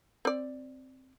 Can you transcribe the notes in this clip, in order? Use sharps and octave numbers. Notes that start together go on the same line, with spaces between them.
C4 D5